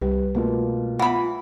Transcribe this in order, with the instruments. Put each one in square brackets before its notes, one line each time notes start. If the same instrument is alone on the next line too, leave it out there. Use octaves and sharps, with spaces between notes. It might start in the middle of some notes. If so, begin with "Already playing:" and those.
[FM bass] C2 [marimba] G3 G4 [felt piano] B4
[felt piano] B2 A#3 F4 [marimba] A3
[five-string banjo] E3 B5 [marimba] B3 F#5 [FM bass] F4